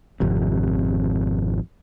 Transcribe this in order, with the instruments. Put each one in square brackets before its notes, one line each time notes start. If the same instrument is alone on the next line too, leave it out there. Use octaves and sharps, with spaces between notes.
[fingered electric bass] G#1 F2 C3